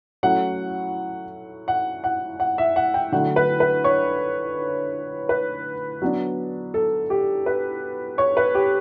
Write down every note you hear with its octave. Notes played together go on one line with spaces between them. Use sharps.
F#3 A3 C#4 E4 F#5
F#5
F#5
F#5
E5
F#5
G5
D3 F#3 A3 E4 F#5
B4
B4
C#5
B4
F#3 B3 D4
A4
G4
B4
C#5
B4
G4